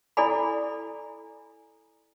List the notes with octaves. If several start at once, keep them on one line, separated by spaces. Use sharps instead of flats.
E4 A4 D5 G#5 B5